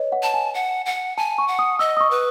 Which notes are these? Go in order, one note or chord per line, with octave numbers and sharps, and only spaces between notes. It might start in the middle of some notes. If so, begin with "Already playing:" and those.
Already playing: B4 C#5 D#5
F#5
A5
G#5
F#5
F#5
G#5 A5
C#6
F#5
D#6
D#5 E6
D#6
C#6
B4